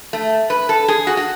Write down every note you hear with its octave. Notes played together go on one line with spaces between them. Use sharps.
A3
B4
A4
G#4
F#4
F#4